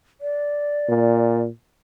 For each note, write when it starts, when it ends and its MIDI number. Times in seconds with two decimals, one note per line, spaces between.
0.21 1.40 74
0.89 1.48 46